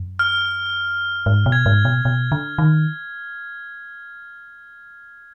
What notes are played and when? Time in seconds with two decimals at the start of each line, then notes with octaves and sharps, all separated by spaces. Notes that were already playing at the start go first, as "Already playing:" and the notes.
Already playing: F#2
0.19 F6
1.26 G#2
1.46 B2
1.52 G#6
1.66 G#2
1.85 B2
2.05 B2
2.32 D3
2.58 D#3